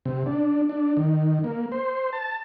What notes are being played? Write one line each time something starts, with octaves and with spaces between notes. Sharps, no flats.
C3
D4
D4
D#3
A#3
C5
A5